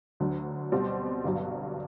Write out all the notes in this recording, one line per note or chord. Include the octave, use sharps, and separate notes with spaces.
D2 D3 F#3
B2 G3 C4 F#4
G1 G2 F#3